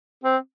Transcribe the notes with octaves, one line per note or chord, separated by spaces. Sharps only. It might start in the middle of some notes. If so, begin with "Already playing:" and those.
C4